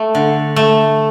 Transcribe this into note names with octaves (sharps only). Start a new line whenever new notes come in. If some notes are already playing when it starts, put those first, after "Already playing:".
Already playing: A3
D3
A3